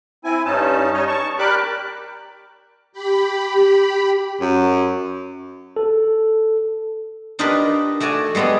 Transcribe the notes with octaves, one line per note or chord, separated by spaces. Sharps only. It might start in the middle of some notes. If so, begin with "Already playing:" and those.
C4 E4 G#5
G2 C#4 D#4 A5
G3 D#4 C#5 D#5
A5 C#6
G4 A#4 D5 B5 D6 F#6
G4 B5
F#2
A4
D4 D#4 F4 G4 A#4 B4
A3 F#4 D5 G#5 A5
G3 G#3 B3 G#4 A4